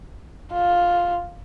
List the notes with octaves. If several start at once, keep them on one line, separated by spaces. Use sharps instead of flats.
F4